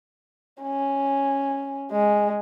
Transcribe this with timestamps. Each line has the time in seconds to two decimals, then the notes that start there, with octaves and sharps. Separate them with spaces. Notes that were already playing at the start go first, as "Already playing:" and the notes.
0.63 C#4
1.91 G#3